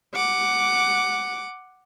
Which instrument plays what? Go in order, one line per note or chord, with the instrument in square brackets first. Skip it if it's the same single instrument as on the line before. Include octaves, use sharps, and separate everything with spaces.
[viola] F#5 D6